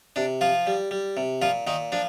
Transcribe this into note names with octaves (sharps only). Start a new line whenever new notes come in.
C3 D4
F3 F4
G3
G3
C3
A#2 F3 F4
A#2 D#3 D#4
F3 D4